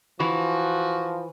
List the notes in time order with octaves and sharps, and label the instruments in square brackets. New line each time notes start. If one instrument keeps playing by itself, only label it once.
[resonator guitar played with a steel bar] E3 [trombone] F3 [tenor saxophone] F#4